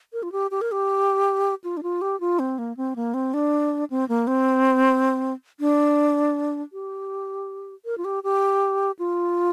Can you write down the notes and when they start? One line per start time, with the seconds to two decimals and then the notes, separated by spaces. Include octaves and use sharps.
0.13 A#4
0.23 F4
0.32 G4
0.51 G4
0.61 A#4
0.72 G4
1.64 F4
1.77 D4
1.83 F4
2.02 G4
2.20 F4
2.39 C4
2.58 A#3
2.77 C4
2.96 A#3
3.14 C4
3.34 D4
3.90 C4
4.09 A#3
4.27 C4
5.60 D4
6.73 G4
7.85 A#4
7.98 F4
8.05 G4
8.24 G4
8.99 F4